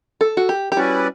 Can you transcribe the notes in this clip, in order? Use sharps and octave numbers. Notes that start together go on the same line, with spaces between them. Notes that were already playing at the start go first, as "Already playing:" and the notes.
A4
F#4
G4
G4
G3 C#4 E4 F#4 B4 D5